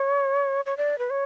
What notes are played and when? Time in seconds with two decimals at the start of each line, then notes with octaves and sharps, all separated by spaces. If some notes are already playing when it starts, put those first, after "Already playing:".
Already playing: C#5
0.66 C#5
0.77 D5
0.98 B4
1.10 C#5